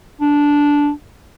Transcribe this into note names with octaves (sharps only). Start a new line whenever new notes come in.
D4